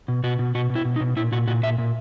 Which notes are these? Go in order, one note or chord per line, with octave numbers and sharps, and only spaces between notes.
B2
B2 F#4
B2
B2 F#4
B2
E4
B2
D#4
B2
A#2 E4
A#2 F#4
A#2 F#4
A#2 E5
A#2